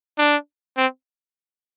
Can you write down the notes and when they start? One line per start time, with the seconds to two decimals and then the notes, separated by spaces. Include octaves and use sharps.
0.19 D4
0.77 C4